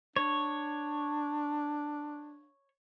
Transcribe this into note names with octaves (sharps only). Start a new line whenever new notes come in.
D4 C#5